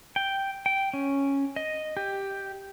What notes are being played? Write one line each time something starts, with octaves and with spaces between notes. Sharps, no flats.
G5
G5
C#4
D#5
G4